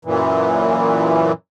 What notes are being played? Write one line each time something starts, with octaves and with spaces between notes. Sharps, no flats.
F#2 A#2 E3